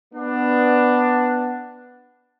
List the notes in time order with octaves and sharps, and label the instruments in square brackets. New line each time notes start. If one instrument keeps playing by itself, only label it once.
[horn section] B3 D4